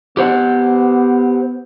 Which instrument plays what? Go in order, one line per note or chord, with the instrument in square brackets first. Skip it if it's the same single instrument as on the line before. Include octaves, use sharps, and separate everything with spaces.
[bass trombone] B3 [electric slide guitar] G4 C5 F#5